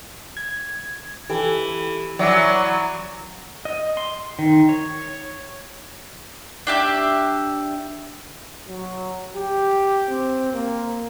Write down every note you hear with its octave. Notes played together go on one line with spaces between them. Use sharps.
G#6
E3 G4 A4
E3 F#3 D5 E5 D6
D#5
C6
D#3
C#5
D4 G4 E5
F#3
G4
C4
A#3